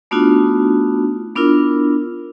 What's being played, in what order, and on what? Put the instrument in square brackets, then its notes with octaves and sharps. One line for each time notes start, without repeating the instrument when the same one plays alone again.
[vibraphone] A3 B3 D4 D#4 F4 F#4
B3 D4 E4 F4 A#4